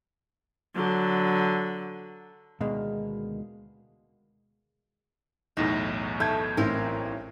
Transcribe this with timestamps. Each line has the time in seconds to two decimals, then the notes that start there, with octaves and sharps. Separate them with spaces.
0.75 D3 F#3
2.60 D2 B2 D#3 G#3 A#3
5.57 B1 E2 A2 D#4
6.20 A3 G6 G#6
6.57 A1 C4 D#4 A#4